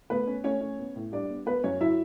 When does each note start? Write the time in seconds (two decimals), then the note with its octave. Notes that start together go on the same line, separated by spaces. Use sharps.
0.10 A3 B3 B4
0.27 C#4
0.44 A3 C#4 C#5
0.61 C#4
0.79 B3
0.96 A2
1.12 G3 D4 D5
1.29 B3
1.46 B3 B4
1.64 F#2 C#4 C#5
1.81 F#3 E4 E5